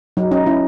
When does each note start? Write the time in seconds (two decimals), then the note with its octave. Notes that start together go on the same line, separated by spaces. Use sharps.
0.17 F#3 D#4
0.31 C#4 D#4
0.46 C#4 E4